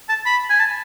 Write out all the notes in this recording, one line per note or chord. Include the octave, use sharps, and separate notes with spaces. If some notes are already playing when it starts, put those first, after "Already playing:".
A5
B5
G#5
A5